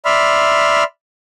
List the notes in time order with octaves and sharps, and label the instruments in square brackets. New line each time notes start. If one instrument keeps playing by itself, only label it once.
[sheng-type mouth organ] D5 E5 B5 C6 F6